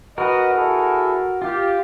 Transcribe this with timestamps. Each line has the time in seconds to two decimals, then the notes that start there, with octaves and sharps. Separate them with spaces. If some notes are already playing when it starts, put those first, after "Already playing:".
0.18 F#4 A#4 B4 D#5
0.54 E4 G#4 A4
1.42 F4 G4